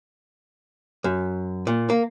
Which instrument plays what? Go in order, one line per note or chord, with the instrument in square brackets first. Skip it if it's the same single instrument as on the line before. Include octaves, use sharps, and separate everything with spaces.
[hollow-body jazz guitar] F#2
A#2
A#3